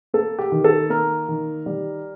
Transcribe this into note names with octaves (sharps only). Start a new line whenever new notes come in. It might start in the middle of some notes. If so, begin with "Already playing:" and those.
A#3 A4
G4
D#3
A4
A#3 A#4
D#3
G3